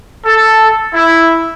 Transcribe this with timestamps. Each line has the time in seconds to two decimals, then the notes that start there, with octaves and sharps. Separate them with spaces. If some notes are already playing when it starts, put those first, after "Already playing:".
0.24 A4
0.93 E4